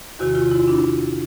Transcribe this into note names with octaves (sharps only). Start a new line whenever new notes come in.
E2 C3 D#3 F#4
F4
E4
D4